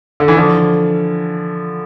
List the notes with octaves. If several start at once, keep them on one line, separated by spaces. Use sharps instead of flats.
D3
E3
D3 F3